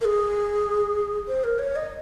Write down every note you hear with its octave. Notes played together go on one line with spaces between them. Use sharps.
A#4
G#4
C5
A#4
C#5
D#5